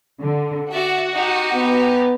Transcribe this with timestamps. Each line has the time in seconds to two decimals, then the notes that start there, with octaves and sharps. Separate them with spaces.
0.21 D3
0.72 F#4 D5 E5
1.14 D#4 G4
1.55 B3